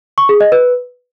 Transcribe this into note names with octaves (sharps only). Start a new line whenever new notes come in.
C#6
G#4
D#5
B4